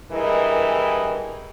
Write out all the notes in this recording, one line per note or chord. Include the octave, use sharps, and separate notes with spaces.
G2 E3 G#3 E4 A#4 D#5